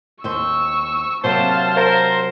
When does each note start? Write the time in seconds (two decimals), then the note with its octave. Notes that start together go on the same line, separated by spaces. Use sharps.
0.24 D#2 C5 C#6 E6
1.24 C3 F#3 A#3 C5 F5 A5
1.77 A#4 C5